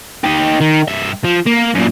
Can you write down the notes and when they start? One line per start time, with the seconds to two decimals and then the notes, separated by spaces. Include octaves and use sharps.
0.24 D#4 G4
0.60 D#3
0.88 G2 E5
1.24 F3
1.47 A#3
1.75 F#2 A#2